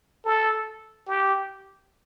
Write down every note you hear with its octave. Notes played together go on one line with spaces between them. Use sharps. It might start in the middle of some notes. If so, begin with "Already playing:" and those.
A4
G4